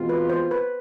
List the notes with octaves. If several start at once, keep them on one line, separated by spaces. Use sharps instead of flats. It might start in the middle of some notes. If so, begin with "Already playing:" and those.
Already playing: E2 B2 G#3 C4 F4
B4
C5
B4